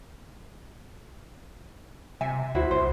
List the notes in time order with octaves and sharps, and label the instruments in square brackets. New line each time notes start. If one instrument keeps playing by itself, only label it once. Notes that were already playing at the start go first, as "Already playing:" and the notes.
[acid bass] C3 [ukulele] E5 G#5
[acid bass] D2 [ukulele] E4 F#4 C5
[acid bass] C2 [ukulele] C5